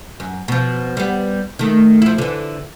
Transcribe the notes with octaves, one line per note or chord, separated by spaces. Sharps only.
F#2
B2 F3
G3 B3
D#3 A3
F3 E4
D3 E3